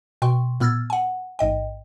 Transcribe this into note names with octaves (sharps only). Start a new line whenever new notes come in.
B2 G5 C6 C#6
A#2 B3 E6 F6 G#6 A6
F#5 G#5
A1 G#2 D#5 G5